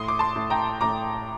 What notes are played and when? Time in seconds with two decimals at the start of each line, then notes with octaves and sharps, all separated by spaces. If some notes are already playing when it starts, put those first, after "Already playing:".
Already playing: A2 C6 D#6
0.08 D6
0.19 A5 C6
0.36 A2
0.50 G5 A#5
0.81 A2 A#5 D6